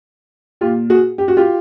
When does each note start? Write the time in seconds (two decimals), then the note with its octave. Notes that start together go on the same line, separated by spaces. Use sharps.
0.61 A#2 F4 G4
0.90 F#4 G#4
1.18 G4
1.28 F#4
1.37 F4 G4